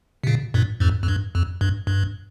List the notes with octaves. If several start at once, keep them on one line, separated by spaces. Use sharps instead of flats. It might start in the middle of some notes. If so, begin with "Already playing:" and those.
C3
A#2 C#3
G2 A#2
F2 G#2
F2
G2
F2
G2
G2